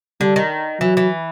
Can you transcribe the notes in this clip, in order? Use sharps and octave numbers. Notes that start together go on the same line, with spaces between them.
D3 G3
D#3
E3 F#3
E3